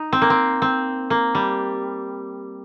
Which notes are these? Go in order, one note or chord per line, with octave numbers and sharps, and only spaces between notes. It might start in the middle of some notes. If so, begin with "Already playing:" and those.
Already playing: D#4
C4
A#3
C4
C4
A#3
G3